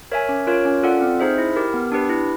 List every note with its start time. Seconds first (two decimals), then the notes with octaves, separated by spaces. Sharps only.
0.12 A#4 C#5 E5 G#5
0.29 C#4
0.47 F4 A#4 C#5
0.65 C#4
0.83 F4 A4 D5 F#5
1.01 C4
1.19 D#4 G#4 C5 E5
1.38 E4
1.56 G4 A#4
1.74 B3
1.92 D4 G4 B4
2.09 E4